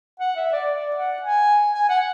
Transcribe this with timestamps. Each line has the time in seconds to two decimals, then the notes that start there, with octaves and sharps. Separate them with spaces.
0.20 F#5
0.36 E5
0.53 D5
0.70 D5
0.96 F#5
1.22 G#5
1.73 G#5
1.89 F#5